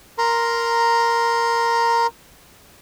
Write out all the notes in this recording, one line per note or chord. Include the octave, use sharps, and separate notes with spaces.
A#4 A#5 C6